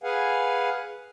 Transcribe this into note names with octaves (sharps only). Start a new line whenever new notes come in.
G#4 B4 F5 F#5 G#5